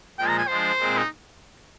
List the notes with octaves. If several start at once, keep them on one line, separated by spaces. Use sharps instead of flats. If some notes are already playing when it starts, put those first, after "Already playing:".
A#2 F3 G#3 G5
A#5
G#5
F3 G#3 D4 C5
A#2 G#3 C4
D#4